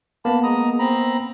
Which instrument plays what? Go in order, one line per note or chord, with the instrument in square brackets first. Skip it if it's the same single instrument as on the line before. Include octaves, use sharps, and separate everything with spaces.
[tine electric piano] A#3 B3 [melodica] A5 B5
[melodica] G#3 A#5 D#6
C4 A#5 B5